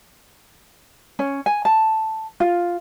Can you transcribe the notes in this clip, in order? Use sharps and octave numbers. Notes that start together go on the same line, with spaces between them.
C#4
G#5
A5
F4